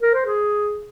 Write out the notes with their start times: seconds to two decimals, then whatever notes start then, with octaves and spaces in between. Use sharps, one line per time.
0.02 A#4
0.14 C5
0.26 G#4